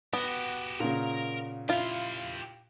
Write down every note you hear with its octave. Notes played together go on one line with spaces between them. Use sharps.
B3 F#4 G4
A#2 C#3 A#4 A#5
E4 F4 G4 F5